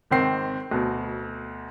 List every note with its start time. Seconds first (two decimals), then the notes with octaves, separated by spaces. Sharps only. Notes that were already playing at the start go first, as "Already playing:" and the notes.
0.11 G#1 D#3 C4 C7
0.71 D2 B2